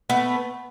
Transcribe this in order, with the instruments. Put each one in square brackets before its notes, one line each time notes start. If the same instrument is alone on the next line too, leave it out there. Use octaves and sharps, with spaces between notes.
[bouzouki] A3 B3